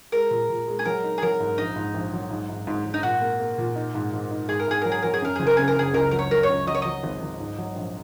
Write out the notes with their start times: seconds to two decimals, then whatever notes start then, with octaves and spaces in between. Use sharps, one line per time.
0.12 G#3 A#4
0.31 A#2
0.50 A#2
0.68 G#3
0.79 G#4
0.85 F#3 A#4
1.03 D#4
1.18 G#4
1.23 F#3 A#4
1.40 G#2
1.58 A#1 D#4
1.76 G#2
1.94 A#1
2.13 F#3
2.31 G#2
2.49 G#2
2.67 G#2
2.85 G#2
2.94 D#4
3.03 A#2 F#4
3.21 A#3
3.40 A#3
3.58 A#2
3.76 D#4
3.95 G#2
4.13 G#2
4.31 D#4
4.49 G#2 G#4
4.59 A#4
4.68 G#2 G#4
4.82 F#3 A#4
4.92 G#4
5.02 F#3 A#4
5.14 G#4
5.22 F#2 A#4
5.36 F#1 G#4
5.47 A#4
5.57 C#3 G#4
5.68 A#4
5.76 F#1 G#4
5.94 C#2 A#4
6.11 F#3 A#4
6.19 C#5
6.31 F#3 A#4
6.43 C#5
6.49 C#2
6.67 F#3 D#5
6.74 C#5
6.82 F#3 D#5
7.03 G#1
7.22 G#1
7.40 G#2
7.58 F#3
7.76 A#1